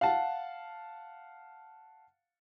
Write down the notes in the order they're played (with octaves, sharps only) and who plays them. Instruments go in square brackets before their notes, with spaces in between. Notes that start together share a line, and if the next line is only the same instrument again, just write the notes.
[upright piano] F5 F#5 A5